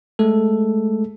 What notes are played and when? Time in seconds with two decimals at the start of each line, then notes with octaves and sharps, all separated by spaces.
0.19 G#3 A3 A4